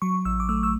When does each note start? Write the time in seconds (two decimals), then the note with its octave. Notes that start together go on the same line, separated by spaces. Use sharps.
0.02 F#3 C#6
0.25 A1 E6
0.40 D6
0.49 A3 E6
0.63 E6